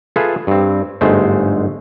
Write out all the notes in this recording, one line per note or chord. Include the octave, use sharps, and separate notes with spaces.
F4 G#4 A4 B4 E5
G2 C4
G1 G#2 G#3 A3 C5